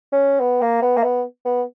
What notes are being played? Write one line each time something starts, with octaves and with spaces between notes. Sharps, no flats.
C#4
B3
A#3
B3
A#3
B3
B3